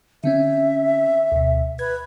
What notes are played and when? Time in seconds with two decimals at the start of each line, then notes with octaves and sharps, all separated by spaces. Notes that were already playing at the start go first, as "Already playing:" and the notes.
0.24 D3 C4 C#4 E5
1.32 D2 B2
1.79 B4 G#6